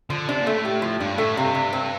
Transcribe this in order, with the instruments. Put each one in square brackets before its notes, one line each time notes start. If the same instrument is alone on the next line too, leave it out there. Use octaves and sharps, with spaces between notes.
[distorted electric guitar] D3 [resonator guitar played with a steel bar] F3
[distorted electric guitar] C3 [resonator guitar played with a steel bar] D4
[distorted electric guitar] A#2
[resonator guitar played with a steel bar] A3
[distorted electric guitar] A2
[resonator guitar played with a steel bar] G4
F3
[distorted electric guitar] G2 [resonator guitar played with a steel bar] D4
[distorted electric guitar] A2 [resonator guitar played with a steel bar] A3
[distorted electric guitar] G2 [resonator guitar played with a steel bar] C3
[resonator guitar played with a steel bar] C3
C4